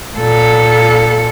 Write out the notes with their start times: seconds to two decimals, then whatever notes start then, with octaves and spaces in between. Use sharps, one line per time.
0.18 A#2 A4